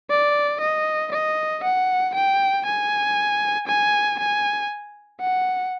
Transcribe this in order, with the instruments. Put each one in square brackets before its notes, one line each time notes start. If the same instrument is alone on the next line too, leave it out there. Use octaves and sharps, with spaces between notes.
[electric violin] D5
D#5
D#5
F#5
G5
G#5
G#5
G#5
F#5